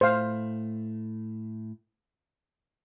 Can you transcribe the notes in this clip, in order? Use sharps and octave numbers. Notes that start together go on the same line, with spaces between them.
A2 A3 C5 F5